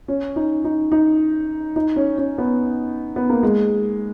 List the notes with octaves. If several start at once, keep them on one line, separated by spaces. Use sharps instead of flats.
C#4
D#4
D#4
D#4
D#4
C#4
C#4
B3
B3
A#3
G#3